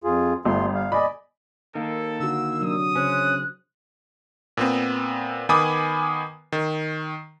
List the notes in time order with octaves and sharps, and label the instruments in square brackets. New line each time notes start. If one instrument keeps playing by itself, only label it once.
[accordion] F2 F4 G#4
[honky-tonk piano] G1 [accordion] A3 F4 C6
[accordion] F5
[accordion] D5 D#5 [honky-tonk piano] G#5 B5
[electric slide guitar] D#3 A#3 [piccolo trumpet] A4
[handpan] D3 F#4 [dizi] E6
[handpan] C3 F#3 D4 [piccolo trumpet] D#6
[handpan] C#3 C5 [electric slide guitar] C#4 [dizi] F#6
[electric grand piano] A#2 B3 C4
D#3 B3 G#5 B5 D6 D#6
D#3